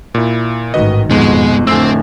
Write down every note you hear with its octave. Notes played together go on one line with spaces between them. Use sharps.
A#2 E4
A1 G#2 D#3 F#4 B4 D#5
F2 G#2 B2 G#3
F2 A2 D3 C4 G#5 C6 E6